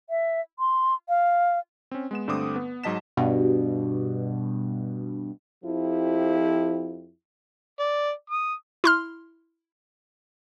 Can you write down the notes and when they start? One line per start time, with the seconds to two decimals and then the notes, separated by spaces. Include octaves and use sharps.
0.10 E5
0.59 C6
1.09 F5
1.91 C4 C#4
2.11 G#3 B3 E7
2.28 G2 D3 A3 C4 D6 D#6
2.56 B3
2.84 G#2 F#3 D#5 A5 B6 E7
3.17 G2 B2
5.63 F2 F3 E4 G4
7.79 D5
8.30 D#6
8.84 E4 C6 F6